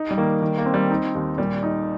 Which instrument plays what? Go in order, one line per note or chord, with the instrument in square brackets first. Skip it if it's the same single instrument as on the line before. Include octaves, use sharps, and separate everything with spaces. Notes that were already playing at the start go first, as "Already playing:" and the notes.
Already playing: [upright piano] D#4
[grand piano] G3
[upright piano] D#3 [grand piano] A#3
[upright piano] D#3
[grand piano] A#3
[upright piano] C4
[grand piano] G3
[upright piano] D#4
D#2
[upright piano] A#2 [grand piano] G3
[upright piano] D#4